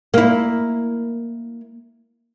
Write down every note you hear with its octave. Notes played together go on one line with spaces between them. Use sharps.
A#3 E4